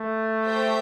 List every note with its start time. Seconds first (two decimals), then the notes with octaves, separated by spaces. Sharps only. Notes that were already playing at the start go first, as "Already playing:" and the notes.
Already playing: A3
0.46 G4 C5 E5 G5